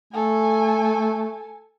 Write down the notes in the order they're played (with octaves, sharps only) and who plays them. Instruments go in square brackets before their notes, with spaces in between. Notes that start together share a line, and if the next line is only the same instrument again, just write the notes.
[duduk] A3 [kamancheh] A4 G#5